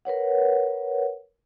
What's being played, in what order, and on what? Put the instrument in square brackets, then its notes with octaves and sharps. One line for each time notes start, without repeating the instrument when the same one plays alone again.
[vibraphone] A#4 B4 C#5 F#5